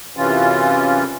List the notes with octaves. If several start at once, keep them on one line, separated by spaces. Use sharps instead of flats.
F#2 C3 E3 C#4 F4